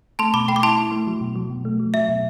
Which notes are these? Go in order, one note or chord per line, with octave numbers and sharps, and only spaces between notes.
A3 A5 C6
B2 B5 D6
A3 G5 B5
D6
E4 A5 C6
E4
A3
F#3
B2
F#3
B2
A3
F#3
F#3 E5
B2